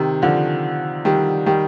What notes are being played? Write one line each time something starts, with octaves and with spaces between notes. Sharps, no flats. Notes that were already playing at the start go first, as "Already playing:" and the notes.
Already playing: C3 D#3
D3 F3
D#3 G3
D#3 G3